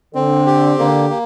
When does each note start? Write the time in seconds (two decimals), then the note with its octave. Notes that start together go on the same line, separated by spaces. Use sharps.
0.15 D3 C4
0.47 G4
0.78 D3 A#3
1.10 A#3